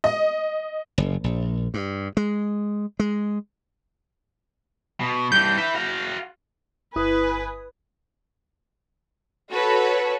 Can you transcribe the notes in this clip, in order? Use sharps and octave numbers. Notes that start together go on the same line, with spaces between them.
D#5
F#1
A#1
G2
G#3
G#3
B2
G2 E3 G6
B4 E5
F#4 F5
G1 E4 B4 G#5 D#6
F#4 A4 B4 C#5